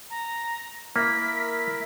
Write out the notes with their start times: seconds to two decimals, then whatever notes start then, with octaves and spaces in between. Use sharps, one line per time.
0.10 A#5
0.96 A#3 E4 A#4 B6